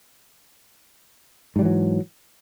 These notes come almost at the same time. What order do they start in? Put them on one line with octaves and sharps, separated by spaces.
G#2 G3 E3 F#3